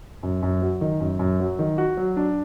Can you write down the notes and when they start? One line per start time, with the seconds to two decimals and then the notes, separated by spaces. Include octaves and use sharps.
0.23 F#2
0.43 F#2
0.62 F#3
0.81 D#3
1.00 F#2
1.19 F#2
1.40 F#3
1.59 D#3
1.78 F#4
1.97 F#3
2.17 D4